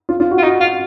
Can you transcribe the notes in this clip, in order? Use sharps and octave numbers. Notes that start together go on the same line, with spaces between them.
F4
F4
F#4
F4
D#4 F#4
F4